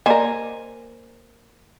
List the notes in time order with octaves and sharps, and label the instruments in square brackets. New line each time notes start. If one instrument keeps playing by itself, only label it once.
[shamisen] A#3 A#4 [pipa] C5 G#5 [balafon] D5 D#5